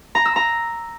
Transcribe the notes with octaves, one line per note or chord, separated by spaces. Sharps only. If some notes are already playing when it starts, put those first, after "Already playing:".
A#5
E6
A#5